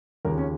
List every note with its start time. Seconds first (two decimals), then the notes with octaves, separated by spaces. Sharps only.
0.25 D#2 C#3 F3 A#4
0.38 C#4